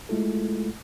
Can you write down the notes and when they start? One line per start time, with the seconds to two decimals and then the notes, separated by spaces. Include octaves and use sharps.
0.09 G#3 A3 E4 F4 A4